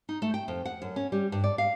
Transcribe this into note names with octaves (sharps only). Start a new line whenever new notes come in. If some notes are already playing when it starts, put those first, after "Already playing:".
D#4
A3
G5
F2
F#5
F#2
C#4
G3
G2
D5
F5